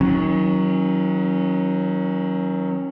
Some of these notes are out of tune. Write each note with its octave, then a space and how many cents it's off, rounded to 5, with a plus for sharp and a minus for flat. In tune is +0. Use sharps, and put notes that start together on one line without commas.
D#3 +35 F#3 +0 C#4 -15